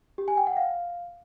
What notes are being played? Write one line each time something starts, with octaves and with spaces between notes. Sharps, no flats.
G4
G#5
G5
F#5
F5